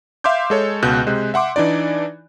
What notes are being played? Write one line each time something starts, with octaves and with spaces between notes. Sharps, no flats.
E5 F5 C6 D6 G6
G#3 A4 C#5
C#2 B2 F#6 G6
C3 G#3
E5 F#5 C6 D6
E3 D4 D#4 D5